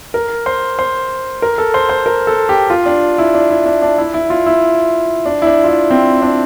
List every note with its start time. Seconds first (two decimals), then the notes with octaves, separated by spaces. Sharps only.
0.14 A#4
0.46 C5
0.79 C5
1.42 A#4
1.58 A4
1.74 C5
1.89 C5
2.06 A#4
2.27 A4
2.49 G4
2.70 F4
2.86 D4
3.18 E4
3.35 D4
3.50 E4
3.66 D4
3.82 D4
3.98 E4
4.14 E4
4.30 F4
4.46 E4
5.26 D4
5.42 E4
5.47 D4
5.64 F4
5.68 E4
5.90 C4
6.22 D4